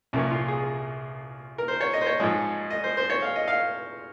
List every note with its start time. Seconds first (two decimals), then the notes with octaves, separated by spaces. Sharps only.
0.13 C2 A#2 F3 C#4
0.30 F4
0.48 G#4
1.58 A#4
1.68 C5
1.81 C#5
1.93 D#5
2.01 C5
2.07 C#5
2.20 G#2 F3 G#3
2.70 D#5
2.84 C5
2.97 C5
3.10 C#5
3.22 F5
3.36 D#5
3.48 F5